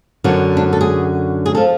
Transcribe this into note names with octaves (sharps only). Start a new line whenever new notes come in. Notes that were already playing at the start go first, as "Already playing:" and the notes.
F#2 D3 F#3
D4
A4
G#4
G#4
F3 A4